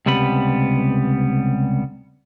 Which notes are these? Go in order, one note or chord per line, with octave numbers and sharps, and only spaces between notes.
C#2 C3 G3 B3 B5